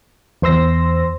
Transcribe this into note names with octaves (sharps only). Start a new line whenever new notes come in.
E2 C5 C6 E6 A#6